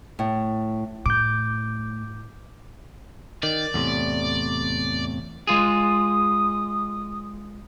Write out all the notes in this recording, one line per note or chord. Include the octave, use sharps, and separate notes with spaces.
A2
A2 D6 G6
D#3 D5
E2 A2 C3
G#3 F4 G#4 D#6